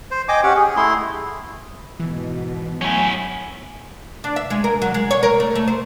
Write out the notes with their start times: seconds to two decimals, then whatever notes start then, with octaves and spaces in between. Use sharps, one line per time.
0.11 C5
0.29 D#5 G5 G#5 D6
0.43 C#4 G4 F#5
0.56 G#4
0.77 A3 E4 C6
2.00 G#2 B2 E3
2.82 F#3 A3 C#4 E4 G#5
4.24 D4
4.36 E5
4.50 G#3
4.64 A#4
4.82 F#3
4.94 G#3
5.11 C#5
5.23 A#4
5.40 A3
5.55 A3
5.67 C5